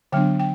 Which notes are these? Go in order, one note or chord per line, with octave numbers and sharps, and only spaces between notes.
D3 F#3 B3 D4 G5
G5